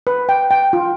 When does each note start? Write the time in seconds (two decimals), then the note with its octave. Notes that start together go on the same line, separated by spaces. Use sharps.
0.07 B4
0.29 G5
0.51 G5
0.73 F4